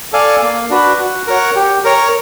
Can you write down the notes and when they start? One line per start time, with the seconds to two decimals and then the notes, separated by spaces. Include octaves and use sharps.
0.12 A4 D5 F5 G#5
0.42 A#3
0.70 D4 F#4 B4
1.00 F#4
1.27 A#4 C#5 F#5
1.56 G4
1.85 A#4 C#5